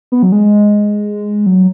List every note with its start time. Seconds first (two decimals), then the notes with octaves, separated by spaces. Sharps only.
0.12 B3
0.23 F#3
0.32 G#3
1.46 F#3